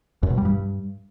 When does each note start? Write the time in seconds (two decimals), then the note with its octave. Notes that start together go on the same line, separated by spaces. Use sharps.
0.23 F#2
0.30 B2
0.38 G3
0.45 G2